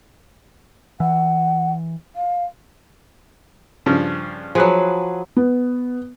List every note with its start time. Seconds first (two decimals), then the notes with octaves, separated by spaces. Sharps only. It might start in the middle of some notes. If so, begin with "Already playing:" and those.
1.00 E3 F#5
2.16 F5
3.86 G2 C#3 F3
4.55 F3 F#3 G#4 B4
5.37 B3